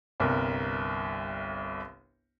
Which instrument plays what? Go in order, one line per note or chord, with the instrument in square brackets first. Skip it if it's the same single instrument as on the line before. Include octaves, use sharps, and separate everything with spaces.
[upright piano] G1 C2 A#4